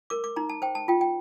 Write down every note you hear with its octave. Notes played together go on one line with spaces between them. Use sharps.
A#4 D6
D6
D#4 A#5
A5
C5 G5
A5
F4 G5
G5